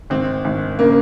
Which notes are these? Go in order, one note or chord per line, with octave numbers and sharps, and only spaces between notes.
G#1 C4
G#1
C#3 A#3